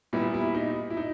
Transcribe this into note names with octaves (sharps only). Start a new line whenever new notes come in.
A#2 G3 B3 E4
E4
D#4
E4
D#4